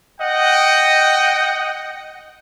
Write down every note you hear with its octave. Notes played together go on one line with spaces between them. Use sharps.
D#5 F#5 G5